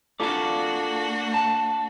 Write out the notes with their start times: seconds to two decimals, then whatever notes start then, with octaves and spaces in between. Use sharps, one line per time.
0.20 A#3 D4 F4 F#4 A4 D5
1.34 A5